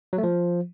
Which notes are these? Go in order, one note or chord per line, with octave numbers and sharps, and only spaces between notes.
F#3
A3
F3